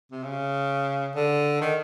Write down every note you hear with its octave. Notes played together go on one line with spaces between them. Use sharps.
C3
C#3
D3
D#3